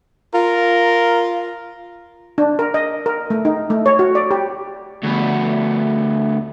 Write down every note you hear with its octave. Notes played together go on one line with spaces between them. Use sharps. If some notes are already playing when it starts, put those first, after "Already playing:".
F4 A#4
D4
A#4
D#5
A#4
A3
D#4
A3
C#5
F#4
D5
G4
D2 B3